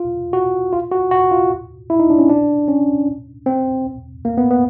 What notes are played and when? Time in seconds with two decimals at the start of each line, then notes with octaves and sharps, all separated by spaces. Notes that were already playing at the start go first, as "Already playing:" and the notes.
Already playing: F4
0.33 F#4
0.73 F4
0.92 F#4
1.11 F#4
1.31 F4
1.90 E4
2.00 D#4
2.10 D4
2.19 C#4
2.29 D4
2.68 C#4
3.46 C4
4.25 A#3
4.38 B3
4.50 B3